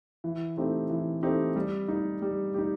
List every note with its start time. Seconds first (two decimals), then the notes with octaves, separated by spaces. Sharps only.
0.24 E3
0.57 A3 C4 D#4 G4
0.89 E3
1.22 A3 C4 D#4 G4
1.56 G3
1.88 D#4 G4
2.22 G3
2.54 D#4 G4